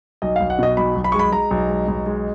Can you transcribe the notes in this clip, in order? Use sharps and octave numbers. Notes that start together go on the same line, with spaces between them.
B1 D#5
B1 F5
F#5
B2 D#5
B1 B5
B1
B5
G#3 C#6
B5
G#3 A#5
B1
G#3
B1
G#3